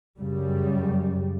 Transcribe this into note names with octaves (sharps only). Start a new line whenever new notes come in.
F#2 C#3 G3